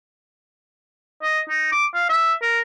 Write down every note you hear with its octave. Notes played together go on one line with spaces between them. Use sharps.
D#5
D#4
D6
F5
E5
A#4